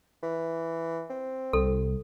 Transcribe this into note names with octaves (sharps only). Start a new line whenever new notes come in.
E3
C4
C2 A4